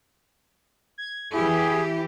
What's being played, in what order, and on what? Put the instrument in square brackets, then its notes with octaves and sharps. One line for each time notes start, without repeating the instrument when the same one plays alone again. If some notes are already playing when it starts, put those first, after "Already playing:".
[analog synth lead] G#6
[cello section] E3 G4 [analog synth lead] E4 [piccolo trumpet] G#4